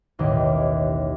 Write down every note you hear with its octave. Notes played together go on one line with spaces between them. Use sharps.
A1 D#2 B2